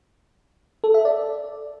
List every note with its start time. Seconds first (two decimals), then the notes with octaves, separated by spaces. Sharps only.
0.84 A4
0.94 E5
1.05 D5